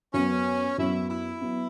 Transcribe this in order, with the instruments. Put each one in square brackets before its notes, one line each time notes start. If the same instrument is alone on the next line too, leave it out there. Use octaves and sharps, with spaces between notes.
[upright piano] F#2 F#3 B3 [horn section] C#4
[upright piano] F#2 F#3 B3 [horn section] E4
[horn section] E4
[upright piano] F#3 B3